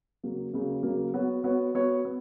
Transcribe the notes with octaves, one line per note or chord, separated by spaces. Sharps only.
C#3 F#3 A#3
C#3 F#3 A#3
C#3 F#3 A#3
B3 F#4 C#5
B3 F#4 C#5
B3 F#4 C#5
B3